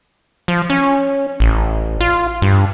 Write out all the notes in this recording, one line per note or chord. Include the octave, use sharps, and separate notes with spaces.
F3
C#4
A1
F4
G2